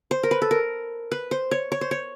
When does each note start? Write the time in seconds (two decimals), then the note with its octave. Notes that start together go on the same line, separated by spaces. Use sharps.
0.11 C5
0.23 A#4
0.31 B4
0.42 A4
0.51 A#4
1.12 B4
1.31 C5
1.51 C#5
1.72 C#5
1.81 C5
1.91 C#5